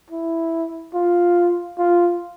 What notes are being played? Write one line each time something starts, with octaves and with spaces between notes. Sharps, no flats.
E4
F4
F4